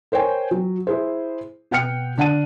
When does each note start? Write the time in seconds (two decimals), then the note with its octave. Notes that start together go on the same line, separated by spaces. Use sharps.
0.12 A#4 C5 C#5 G5 G#5
0.51 F#3
0.87 E4 G#4 C5
1.71 B2 F#5 G5 F6 C#7
2.18 D3 D4 F#5 A5 D#7